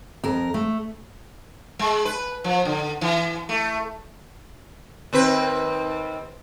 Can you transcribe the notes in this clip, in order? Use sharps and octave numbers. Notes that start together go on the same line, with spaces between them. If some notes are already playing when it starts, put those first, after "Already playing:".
F2 A#4
A3
G#3
B4
F3
D3
E3
A3
D#2 C4 B4